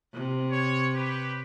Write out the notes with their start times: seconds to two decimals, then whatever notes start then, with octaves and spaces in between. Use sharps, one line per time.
0.14 C3
0.52 C#5
0.95 G4 B4